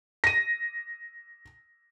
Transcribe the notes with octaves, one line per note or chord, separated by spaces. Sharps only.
A#6 D#7